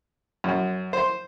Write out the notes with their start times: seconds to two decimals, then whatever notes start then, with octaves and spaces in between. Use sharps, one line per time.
0.44 F#2
0.93 C5